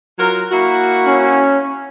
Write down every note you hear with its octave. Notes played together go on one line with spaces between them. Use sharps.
F#3 F4 A#4
A#3 E4 F#4
C#4